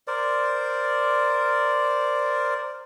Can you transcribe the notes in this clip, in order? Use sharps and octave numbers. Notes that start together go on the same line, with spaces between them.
A#4 C5 D5